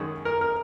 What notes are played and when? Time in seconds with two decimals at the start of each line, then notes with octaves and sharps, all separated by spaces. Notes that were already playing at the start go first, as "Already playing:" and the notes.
Already playing: F#2 D#3 G#3 C#4
0.25 A#4
0.41 A#4